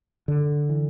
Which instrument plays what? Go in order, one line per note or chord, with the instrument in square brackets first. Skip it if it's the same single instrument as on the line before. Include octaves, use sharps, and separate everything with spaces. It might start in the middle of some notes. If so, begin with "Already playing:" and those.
[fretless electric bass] D3
E3